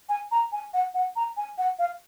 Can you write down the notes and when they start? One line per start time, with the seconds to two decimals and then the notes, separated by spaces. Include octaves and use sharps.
0.09 G#5
0.32 A#5
0.52 G#5
0.74 F#5
0.94 F#5
1.16 A#5
1.37 G#5
1.58 F#5
1.79 F5